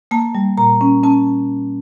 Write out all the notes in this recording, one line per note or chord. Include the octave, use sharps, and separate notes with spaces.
A#3 A5
G3
A#2 A#5
C#4
C#4 A5